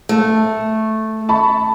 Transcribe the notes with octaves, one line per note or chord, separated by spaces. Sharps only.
A3
A5 B5 C#6